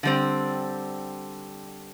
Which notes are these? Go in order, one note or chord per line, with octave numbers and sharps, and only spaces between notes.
D3 G3 C4